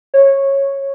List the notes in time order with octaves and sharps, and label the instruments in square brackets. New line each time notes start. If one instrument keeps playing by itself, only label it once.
[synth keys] C#5